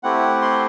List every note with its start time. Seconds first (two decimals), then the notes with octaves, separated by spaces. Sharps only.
0.03 A3 C4 E4 G4 F#5
0.42 C6